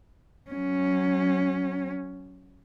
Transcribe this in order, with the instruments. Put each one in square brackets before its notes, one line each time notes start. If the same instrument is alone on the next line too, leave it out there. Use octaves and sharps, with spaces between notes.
[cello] F#3 C#4